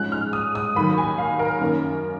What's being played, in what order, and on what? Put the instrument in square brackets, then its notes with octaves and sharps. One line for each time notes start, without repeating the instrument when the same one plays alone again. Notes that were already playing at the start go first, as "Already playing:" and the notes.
Already playing: [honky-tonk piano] G#2 F3 G#3 C#4 F#6
F6
D#6
D#6
D#2 D#3 F#3 B5
G#5
F5
A#4
F#2 D#3 A#3 C#4